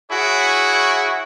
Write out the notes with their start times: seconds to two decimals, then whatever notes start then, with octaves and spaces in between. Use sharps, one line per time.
0.10 E4 F#4 G#4 C#5